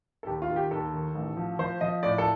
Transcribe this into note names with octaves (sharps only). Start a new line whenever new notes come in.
A4
D#2 G4
F4
D#3
G4
D#2 A4
D#3
A1
F3
F3 C5
F3 D#5
A2 D5
A4